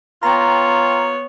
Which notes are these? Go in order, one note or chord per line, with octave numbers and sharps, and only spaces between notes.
B3 F4 C#5 G5 A#5